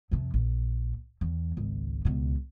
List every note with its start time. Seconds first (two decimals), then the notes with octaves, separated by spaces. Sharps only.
0.11 F2 C3
0.34 A#1
1.21 E2
1.57 G#1 C#2
2.05 C#2 B2